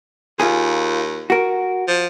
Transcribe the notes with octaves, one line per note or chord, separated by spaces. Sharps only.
D#2 F4 G#4
F#4 A#4
F3